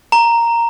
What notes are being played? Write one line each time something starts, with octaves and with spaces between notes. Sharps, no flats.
A#5